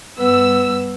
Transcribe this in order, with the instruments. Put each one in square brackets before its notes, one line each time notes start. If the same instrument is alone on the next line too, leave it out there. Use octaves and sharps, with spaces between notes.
[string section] G2 E6 [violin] B3